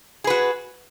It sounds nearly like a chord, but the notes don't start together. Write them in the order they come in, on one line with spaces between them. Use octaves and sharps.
G#4 B4 F#4